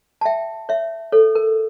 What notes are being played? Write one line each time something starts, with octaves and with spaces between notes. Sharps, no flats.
A5
E5 G5
C#5 E5
A4 C#5
A#4